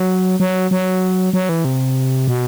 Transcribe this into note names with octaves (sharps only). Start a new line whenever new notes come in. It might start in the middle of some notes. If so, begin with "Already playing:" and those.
Already playing: F#3
F#3
F#3
F#3
E3
C3
B2